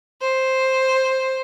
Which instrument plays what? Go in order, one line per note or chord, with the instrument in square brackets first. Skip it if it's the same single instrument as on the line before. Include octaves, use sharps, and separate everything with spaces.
[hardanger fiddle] C5